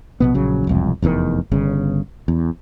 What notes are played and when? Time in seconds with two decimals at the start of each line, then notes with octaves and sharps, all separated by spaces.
0.20 A#1 B2 B3
0.34 A#1 C#3 F#3
0.67 E1 C2 F2
1.02 F1 E2 C3 D#3
1.52 G1 C#3
2.28 E2